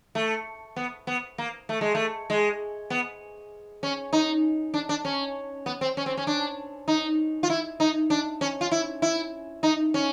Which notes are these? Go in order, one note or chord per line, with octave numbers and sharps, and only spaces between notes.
A3
B3
B3
A#3
A3
G#3
A3
G#3
B3
C#4
D#4
D4
D4
C#4
B3
C4
C#4
C4
C#4
D4
D#4
F4
E4
D#4
D4
C#4
F4
E4
E4
D#4
C#4